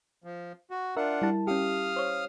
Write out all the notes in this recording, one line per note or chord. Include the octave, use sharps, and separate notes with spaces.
F3
F#4
D4 F4 A#4 E5 F#5
G3 E4 A5
C#4 G4 F5 D#6 F6
C5 C#5